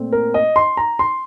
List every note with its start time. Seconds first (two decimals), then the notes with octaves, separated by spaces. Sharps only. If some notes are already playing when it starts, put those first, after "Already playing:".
Already playing: A#2 A3 C4
0.12 A#4
0.34 D#5
0.56 C6
0.77 A#5
0.99 C6